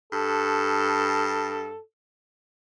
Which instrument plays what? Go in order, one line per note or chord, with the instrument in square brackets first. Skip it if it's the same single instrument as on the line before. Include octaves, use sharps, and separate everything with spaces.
[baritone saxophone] G2 [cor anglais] A4